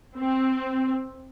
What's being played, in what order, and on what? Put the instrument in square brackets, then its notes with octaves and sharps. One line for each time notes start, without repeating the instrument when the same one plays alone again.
[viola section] C4